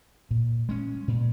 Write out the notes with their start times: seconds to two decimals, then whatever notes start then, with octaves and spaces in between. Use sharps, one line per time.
0.31 A#2
0.69 G#3 C#4
1.08 A#2